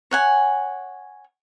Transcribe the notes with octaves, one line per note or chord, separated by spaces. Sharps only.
C#5 F#5 G#5